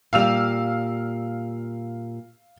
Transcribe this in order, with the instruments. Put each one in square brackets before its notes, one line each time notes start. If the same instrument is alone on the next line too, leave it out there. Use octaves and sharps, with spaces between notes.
[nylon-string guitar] A#2 G3 [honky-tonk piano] F5 E6 F7